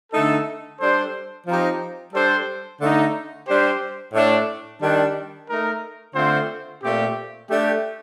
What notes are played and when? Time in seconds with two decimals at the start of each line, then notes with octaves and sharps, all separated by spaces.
0.13 D3 A3 D#4 A4
0.80 G3 D4 A4 C5
1.47 F3 C4 D#4 G4
2.14 G3 D4 A4 C5
2.81 D3 A3 D#4
3.47 G3 D4 G4 C5
4.14 A2 A3 D4
4.81 D#3 G3 D4
5.49 A3 D#4 A#4
6.15 D3 A3 C4 F4 C5
6.82 A#2 A3 C4 G4
7.50 A3 D4 G4